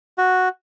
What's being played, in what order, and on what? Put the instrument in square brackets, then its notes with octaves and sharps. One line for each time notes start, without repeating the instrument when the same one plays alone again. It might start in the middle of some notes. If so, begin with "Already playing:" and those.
[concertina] F#4